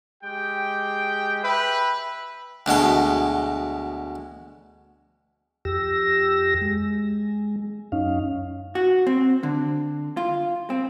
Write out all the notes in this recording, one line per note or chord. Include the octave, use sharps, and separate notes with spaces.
G#3 G4 G5
B4 E5 G5
D2 B2 G#3 C6
F2 G4 E6 A#6
G#3
F#2 C#4 D#4 F5
F#4
C4
D3
F4
C4